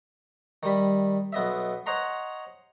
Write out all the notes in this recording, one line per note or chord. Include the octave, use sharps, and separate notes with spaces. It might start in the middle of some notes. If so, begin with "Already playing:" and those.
D#3 G3 B5
B1 B3 D#5 E5
C5 C#5 D#5 F#5 A#5 C6